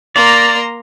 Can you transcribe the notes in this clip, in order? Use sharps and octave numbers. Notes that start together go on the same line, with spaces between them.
A#3 D5 A#5 C6